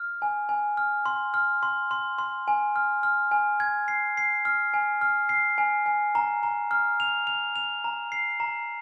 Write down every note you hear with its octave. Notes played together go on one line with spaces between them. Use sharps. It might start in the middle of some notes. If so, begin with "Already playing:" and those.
Already playing: F6
G#5
G#5
F6
C6
F6
C6
C6
C6
G#5
F6
F6
G#5
G#6
C7
C7
F6
G#5
F6
C7
G#5
G#5
A#5
A#5
F6
F7
F7
F7
A#5
C7
A#5